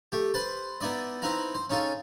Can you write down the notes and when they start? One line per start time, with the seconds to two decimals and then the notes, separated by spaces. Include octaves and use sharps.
0.12 A3 G4
0.34 B4 C5 A5 C6
0.81 B3 D#4 E4 D5 D#5
1.22 C4 D#4 E4 B4 F5 A#5
1.55 C5
1.70 C#4 D#4 F4 G#4 A4